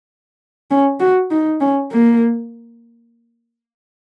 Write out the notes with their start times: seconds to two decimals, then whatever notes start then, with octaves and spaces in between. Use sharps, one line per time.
0.71 C#4
1.00 F#4
1.31 D#4
1.61 C#4
1.91 A#3